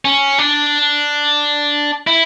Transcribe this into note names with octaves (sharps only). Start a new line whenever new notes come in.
C#4
D4
E4